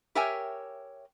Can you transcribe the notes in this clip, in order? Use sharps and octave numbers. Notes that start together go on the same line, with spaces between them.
G4 A#4 C#5 E5 G5 G#5